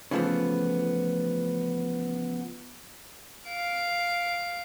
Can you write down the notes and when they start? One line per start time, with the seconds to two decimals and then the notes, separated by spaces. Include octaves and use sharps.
0.11 C#3 E3 F3 A3 B3
3.47 F5 D7